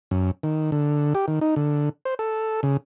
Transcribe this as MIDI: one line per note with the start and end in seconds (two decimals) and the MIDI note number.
0.11 0.31 42
0.43 0.71 51
0.72 1.13 50
1.15 1.26 67
1.28 1.39 51
1.41 1.55 63
1.56 1.89 50
2.05 2.14 72
2.19 2.61 69
2.63 2.77 49